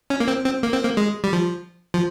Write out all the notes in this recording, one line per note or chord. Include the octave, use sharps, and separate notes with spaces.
C#4
A#3
C4
C4
A#3
C4
A#3
G#3
G3
F3
F3